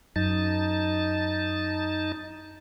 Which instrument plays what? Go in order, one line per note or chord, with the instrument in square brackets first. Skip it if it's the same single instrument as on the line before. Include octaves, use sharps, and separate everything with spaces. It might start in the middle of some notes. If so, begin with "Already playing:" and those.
[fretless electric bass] F#2 [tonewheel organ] D#4 A5